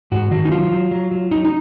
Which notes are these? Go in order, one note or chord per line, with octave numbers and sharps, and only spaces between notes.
G#2 F#4
D#3 F#4
D#4
F#3 F4
F#3
F#3
F#3
F#3 D#4
D#4